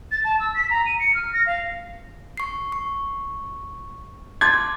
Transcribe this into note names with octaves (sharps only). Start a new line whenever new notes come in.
A6
A5
E6
B6
A#5
D#7
C#7
F6
A#6
F5
C#6 C7
C#6
A5 C6 D6 G#6